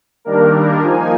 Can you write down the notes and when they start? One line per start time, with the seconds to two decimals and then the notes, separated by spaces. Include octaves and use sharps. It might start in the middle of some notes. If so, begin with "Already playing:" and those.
0.25 D#3 G3 A#3 D4 A#4
0.54 A#4
0.82 F3 A#3 D#4 G#5